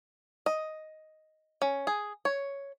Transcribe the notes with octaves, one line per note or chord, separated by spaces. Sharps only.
D#5
C#4
G#4
C#5